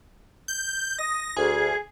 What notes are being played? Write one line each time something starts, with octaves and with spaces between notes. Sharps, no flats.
G6
D#6 A#6
D2 G#4